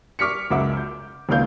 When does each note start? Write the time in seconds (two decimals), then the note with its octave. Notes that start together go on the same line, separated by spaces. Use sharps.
0.19 C#6 D6 F6 B6 C#7
0.50 C#2 F#2 E5 F#5 D6
0.77 G6
1.29 G#1 C#2 A#3 F5 G6